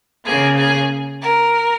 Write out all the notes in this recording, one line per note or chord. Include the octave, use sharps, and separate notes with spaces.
C#3 A#3 G#4
G#4
A#4